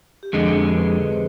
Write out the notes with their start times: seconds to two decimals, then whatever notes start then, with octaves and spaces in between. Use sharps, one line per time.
0.23 G4
0.33 F2 D3 G#3 G#4
0.73 B4
1.13 C5